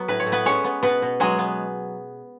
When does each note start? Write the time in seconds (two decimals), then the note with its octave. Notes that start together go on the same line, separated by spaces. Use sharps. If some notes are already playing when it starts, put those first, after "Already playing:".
Already playing: F#3 B3
0.08 A2 B4
0.20 C#5
0.26 A2
0.32 B3 B4
0.45 G#3 C#4 C#5
0.64 B3
0.82 B2 B3 B4
1.02 B2
1.20 F#3 G#3 G#4
1.38 B3